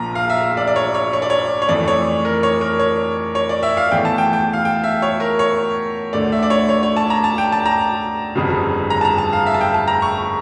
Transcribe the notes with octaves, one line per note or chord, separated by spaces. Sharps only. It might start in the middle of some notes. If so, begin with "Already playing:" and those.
Already playing: A#1 A#2 F3 A#5
F5
E5
E5
D5
D5
C#5
C#5
C#5
D5
C#5
C#5
F2 E3 A3 D5
C#5
A#4
C#5
A#4
C#5
C#5
D5
E5
F5
E2 E3 A3 G5
A5
G5
G5
F5
G5
E5
C#5
A#4
C#5
D2 D3 A3 D5
E5
D5
C#5
C#5
C#5
A5
A#5
A5
G5
A5
A#5
G1 F2 C#3 G3
A#5
A5
A#5
A5
F5
E5
A5
G5
A5
A#5
C#6